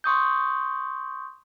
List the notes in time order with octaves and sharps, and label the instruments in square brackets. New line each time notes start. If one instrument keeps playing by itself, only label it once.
[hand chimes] C6 C#6 D#6 G6